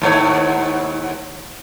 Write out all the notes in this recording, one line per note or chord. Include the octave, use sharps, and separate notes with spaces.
D#2 G#2 C#5